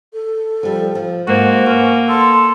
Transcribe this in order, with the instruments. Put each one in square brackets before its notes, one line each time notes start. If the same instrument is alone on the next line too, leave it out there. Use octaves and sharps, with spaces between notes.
[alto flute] A4
[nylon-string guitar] F3 G3
F3
[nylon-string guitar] G#2 [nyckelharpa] A#3 [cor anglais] F#4 [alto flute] C5
[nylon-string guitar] B3 [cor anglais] C#4
[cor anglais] A4 [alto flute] C6